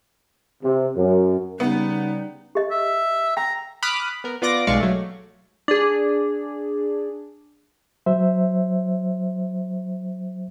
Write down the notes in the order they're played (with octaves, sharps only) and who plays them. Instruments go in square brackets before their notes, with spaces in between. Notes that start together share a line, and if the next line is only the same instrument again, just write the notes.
[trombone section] C3
F#2
[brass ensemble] C#3 G3 [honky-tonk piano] B3 [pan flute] D#4
[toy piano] G4 D#5
[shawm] E5
[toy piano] G5 [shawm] A#5
[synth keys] B5 D6 D#6 F6 F#6
B3 A#4
B3 F4 D5 D6 A#6
B1 G#3 D5 F5 C#6
F#3 A3
D4 G#4
[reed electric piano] F#3 C5 E5